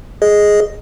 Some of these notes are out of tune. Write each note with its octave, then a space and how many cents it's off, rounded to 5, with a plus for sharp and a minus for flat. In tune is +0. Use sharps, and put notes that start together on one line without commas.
G#4 +0 D#5 +0